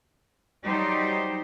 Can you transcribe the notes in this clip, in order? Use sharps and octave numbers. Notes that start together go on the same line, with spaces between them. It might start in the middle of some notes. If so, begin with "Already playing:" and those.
F#3 G3 D#4 G4 C5